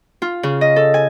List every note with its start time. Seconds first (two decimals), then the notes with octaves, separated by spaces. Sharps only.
0.22 F4
0.43 C#3
0.61 D#5
0.76 A4
0.94 G#5